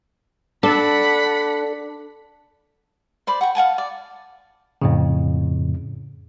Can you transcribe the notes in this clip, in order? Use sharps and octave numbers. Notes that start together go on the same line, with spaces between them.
D4 A4 F#5 B5
C5 D5 B5
F#5 G5 C#6
F5 F#5 G#5 A5
D5
F2 A2 C#3